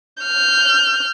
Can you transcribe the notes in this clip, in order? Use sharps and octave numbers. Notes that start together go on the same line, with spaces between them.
F6 G6